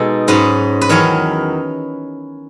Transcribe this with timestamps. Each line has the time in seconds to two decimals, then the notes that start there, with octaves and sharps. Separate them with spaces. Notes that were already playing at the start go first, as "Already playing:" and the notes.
Already playing: B2 G#3 D#4 A4
0.28 G#2 F#3 C#4 B4
0.81 B4
0.89 E2 D#3 F#3 C#4 C#5